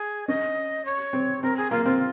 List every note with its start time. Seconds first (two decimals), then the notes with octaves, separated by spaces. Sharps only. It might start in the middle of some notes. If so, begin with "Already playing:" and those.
Already playing: G#4
0.28 C#4 D#5
0.85 C#5
1.13 C4
1.43 C4 A#4
1.57 G#4
1.71 A#3 F4
1.86 C4 F4